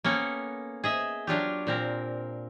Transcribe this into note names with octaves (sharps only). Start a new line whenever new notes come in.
A#3 B3 C#4 A4 G5
G#4 D#5 E5
F#3 D4 F4 G4
A#2 C4 A#4